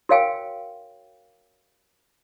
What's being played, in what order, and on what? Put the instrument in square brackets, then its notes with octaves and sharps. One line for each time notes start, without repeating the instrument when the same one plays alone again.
[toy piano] F#4 A#4 C#5 F5 G5 G#5